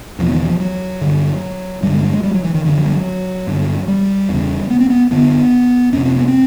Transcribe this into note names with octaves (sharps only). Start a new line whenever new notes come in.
E2 B2 F3
D#3
F3
F#3
G2 D3
G2 D3 G3
G#3
G3
G#3
G3
F#3
E3
D#3
F#2 D3 D#3
F3
G3
F#3
G2 D3
G3
E2 C#3
B3
C4
B3
F#2 D3 B3
F2 C3 C#4
C4
B3
C4